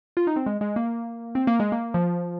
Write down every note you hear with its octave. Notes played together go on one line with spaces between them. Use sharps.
F4
D#4
C4
G#3
G#3
A#3
C4
A#3
G#3
A#3
F3